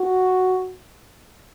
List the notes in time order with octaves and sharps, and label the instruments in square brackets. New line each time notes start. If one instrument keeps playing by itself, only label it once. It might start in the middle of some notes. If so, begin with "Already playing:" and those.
Already playing: [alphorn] F#4